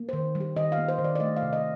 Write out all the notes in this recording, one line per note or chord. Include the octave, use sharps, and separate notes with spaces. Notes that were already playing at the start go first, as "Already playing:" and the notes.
Already playing: A#3
D#3 C5
G3
G4
D#3 D#5
F5
A#3
C5
D#3
D5
D5
A3 D#5
F5
C3
D#5